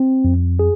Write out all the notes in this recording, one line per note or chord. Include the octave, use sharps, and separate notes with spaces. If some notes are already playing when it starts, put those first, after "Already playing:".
Already playing: C4
F2
G#4